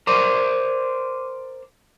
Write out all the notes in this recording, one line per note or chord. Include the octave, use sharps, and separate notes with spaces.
A#4 C5 D5 D6 D#7